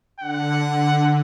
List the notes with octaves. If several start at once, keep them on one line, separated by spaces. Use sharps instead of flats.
D3 F#5